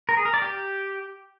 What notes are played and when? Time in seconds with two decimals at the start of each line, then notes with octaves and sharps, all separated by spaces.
0.09 A#4
0.17 G#4
0.25 A#4
0.34 D5
0.42 G4